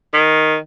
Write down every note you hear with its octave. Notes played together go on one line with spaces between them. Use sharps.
D#3